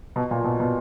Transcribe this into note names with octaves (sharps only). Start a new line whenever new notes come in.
B2
A#2
B2
B2